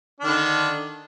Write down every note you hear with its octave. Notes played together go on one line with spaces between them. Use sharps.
D3 D#3 D4